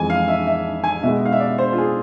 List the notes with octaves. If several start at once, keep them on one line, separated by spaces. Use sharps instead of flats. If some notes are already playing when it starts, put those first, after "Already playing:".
Already playing: F2 E3 G#3 G#5
F5
E5
E5
G#5
B2 G#3 E5
F5
E5
D5
C5
F4
G#4